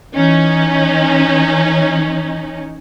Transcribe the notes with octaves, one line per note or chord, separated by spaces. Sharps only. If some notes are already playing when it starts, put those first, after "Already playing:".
E3 C#4 D#4